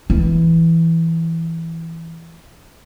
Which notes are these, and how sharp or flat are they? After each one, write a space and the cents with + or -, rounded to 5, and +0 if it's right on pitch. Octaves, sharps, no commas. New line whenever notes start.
E3 +0